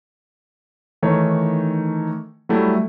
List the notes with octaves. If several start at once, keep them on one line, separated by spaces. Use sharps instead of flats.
D#3 E3 A3 D#4 C#5
F#3 G3 A3 E4